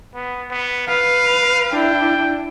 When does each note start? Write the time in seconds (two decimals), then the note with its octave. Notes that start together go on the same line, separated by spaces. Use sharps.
0.14 B3
0.51 B3
0.87 B4 F5
1.72 D4 E4 G5